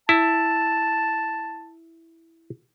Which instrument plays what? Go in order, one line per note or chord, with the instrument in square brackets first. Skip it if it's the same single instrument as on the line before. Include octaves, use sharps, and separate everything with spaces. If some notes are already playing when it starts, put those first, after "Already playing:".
[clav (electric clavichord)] E4 [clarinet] A5